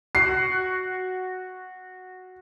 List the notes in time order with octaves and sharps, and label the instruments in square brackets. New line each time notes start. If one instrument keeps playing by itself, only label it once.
[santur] F#4 [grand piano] C7